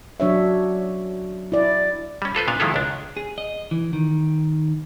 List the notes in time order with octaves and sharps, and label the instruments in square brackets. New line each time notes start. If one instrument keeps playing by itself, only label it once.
[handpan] F#3 D4 C#5 E5
E4 D5
[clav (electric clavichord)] G3 C#4
F4 A4 B4 C5
A#2 B3 D4 F5 G#5
D#3 F3 G#3 E4 F4 A4
C#2 D4
[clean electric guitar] G#4
D#5
E3
D#3